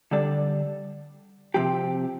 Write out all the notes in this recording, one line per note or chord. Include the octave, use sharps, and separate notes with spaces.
D3 G3 D4 A4 D5
C3 F3 C4 G4